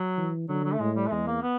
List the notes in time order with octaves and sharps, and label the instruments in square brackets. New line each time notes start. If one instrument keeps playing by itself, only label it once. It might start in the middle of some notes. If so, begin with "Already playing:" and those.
Already playing: [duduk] F#3
[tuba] E3
[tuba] D3 [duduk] F#3
[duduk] F#3
A3
[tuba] A2 [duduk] G#3
[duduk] G3
A3
[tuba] E2 [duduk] G#3
[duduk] A#3
B3